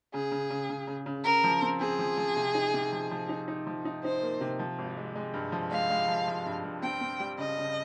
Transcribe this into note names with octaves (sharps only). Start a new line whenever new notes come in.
C#3 G#4
C#3
C#3
C#3
C#3
C#3
C#3 A#4
F3
C4
C4 G#4
F3
F3
C3
D#4
C3
F3
F3
D#4
D#4
F3
D#4
D#4 C5
A#3
C3
F3
G#1
G#3
G#3
G2
F3
G#3 F5
G#3
F3
F3
G2
G2
C4 G5
C4
G3
C#3 D#5
C#3